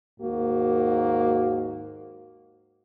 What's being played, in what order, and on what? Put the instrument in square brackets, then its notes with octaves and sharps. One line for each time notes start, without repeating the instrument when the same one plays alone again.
[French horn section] D#2 G#2 A#3 F#4